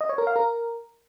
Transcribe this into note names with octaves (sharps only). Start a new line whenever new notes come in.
D#5
C#5
A#4
F5
A#4